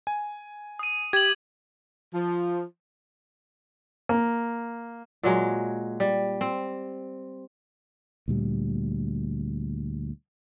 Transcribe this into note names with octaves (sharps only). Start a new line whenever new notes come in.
G#5
D#6 D#7
G4 G#6 F#7
F3
A#3
A#2 F#3 G#3
G3
C4
D2 A#2 G3